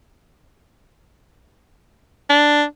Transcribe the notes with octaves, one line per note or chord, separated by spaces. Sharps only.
D4